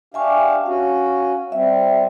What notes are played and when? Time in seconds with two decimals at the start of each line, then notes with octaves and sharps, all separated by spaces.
0.14 D4 G4 E5 F5 G#5 C#6
0.66 C#4 F#4 F5
1.52 G3 C4 E5